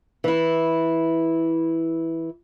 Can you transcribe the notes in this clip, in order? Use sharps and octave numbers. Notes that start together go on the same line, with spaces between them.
E3 E4